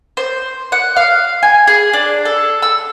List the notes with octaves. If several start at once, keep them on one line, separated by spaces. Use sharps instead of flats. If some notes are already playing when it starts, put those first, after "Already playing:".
C5
F#5
F5
G#5
G#4
D4
A4
E6